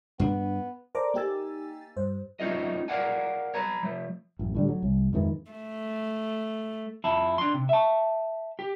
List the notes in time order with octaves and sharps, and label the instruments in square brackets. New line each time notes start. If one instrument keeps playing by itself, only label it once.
[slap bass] G2 D4 [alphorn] B3
[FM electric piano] A4 A#4 C5 D5 A#5 D6
A#3 D#4 G4 G#5 E6 A6
G2 C5
[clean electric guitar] A3 C#4 D#4 F4 D#5
A#4 B4 D5 F5 F#5 G#5
C#5 A#5 B5
F3 A3
[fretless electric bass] A1 F#2
A2 D3 G3
F#3
C2
F2 G#2 D#3 E3
[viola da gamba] A3
[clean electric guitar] F2 E4 A5
D4 C6
C3
E5 A5
G4